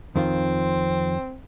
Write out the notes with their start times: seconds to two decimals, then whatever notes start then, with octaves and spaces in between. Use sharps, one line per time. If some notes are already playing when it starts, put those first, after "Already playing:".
0.16 F2 D#3 C4 F4